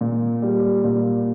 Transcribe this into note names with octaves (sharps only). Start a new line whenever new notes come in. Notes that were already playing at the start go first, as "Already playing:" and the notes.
A#2
G3
A#2